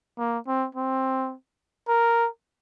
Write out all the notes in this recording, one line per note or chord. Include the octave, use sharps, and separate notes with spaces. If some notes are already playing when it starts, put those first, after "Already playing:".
A#3
C4
C4
A#4